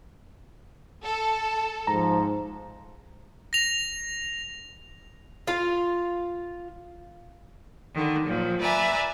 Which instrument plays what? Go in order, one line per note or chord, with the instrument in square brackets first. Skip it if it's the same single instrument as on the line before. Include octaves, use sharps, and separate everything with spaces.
[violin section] A4
[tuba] G#2 [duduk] F3 [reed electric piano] A#5
[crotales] A#6 F7
[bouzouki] F4 F5
[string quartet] D3 D#3
A#2 F3 F#3
B4 D5 E5 G#5 A#5